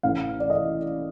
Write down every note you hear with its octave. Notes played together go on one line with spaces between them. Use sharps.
A1 A2 E3 F5
D5
D#5